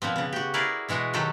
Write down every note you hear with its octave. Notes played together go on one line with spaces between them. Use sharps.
A#2 F3 B3 C4
C#3 B3
F#4 G4
E4 G#4 A#4 B4 D5
B2 E3 G#3 F#4 D#5
D#3 F#3 F#4 G4 A4 C5